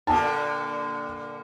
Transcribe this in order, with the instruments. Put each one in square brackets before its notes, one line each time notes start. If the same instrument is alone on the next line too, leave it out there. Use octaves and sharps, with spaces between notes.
[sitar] G2 A#2 D3 [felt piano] A5